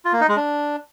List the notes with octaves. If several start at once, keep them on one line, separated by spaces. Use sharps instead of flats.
F4
A#3
D#4
G#3
D4